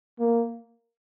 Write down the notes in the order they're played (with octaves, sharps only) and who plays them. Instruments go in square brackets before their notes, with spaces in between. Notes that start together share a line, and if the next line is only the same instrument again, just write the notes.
[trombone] A#3